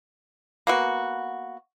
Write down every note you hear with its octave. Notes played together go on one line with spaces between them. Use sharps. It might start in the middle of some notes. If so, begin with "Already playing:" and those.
A#3 B3 F#4